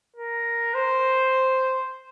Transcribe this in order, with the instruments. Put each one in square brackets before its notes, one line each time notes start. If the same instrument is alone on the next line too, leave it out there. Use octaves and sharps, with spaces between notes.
[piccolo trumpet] A#4
C5